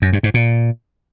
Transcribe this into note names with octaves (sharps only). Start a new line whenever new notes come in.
F#2
G2
G#2
A#2